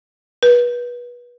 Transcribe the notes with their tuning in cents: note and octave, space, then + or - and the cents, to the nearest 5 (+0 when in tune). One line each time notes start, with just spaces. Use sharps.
B4 -25